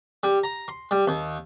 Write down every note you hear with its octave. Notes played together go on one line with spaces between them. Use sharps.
G3
A#5
C6
G3
D#2